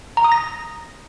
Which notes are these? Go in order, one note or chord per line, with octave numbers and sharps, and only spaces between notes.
A#5
D#6
A#6